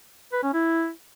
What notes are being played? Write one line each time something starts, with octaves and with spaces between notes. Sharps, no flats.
B4
C#4
E4